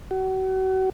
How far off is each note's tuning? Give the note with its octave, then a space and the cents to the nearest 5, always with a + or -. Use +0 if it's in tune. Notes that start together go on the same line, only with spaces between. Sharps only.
F#4 +35